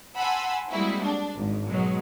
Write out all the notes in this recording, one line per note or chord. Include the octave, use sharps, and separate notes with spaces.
F#5 G#5 A5 B5 C6 E6
G3 G#3 A#3 C4 E4 F#4
D4
G#1 G#2
B2 F#3 G#3